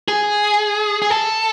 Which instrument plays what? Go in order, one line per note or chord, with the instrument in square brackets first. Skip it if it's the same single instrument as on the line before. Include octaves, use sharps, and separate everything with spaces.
[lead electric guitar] G#4
G#4
A4